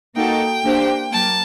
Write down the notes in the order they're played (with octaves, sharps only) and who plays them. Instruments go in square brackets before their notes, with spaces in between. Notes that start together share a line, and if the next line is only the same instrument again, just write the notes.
[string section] A#3 D#4 F#4 A4 [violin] G5
[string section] A#3 D4 G4 C5
[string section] F#3 A#3 [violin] A5